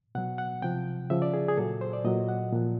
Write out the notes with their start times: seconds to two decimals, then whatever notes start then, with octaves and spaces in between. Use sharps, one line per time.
0.15 B2 F#3 F#5
0.38 F#5
0.62 C3 F3 G5
1.10 C#3 F3 E5
1.22 D5
1.34 G#4
1.48 G#4
1.57 A#2 F#3 A4
1.81 C5
1.93 D5
2.05 A#2 F#3 D#5
2.29 F#5
2.52 A#2 F3